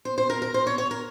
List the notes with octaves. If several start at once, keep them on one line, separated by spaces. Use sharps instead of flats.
C5
C5
A#4
A#4
C5
C#5
C#5
A#4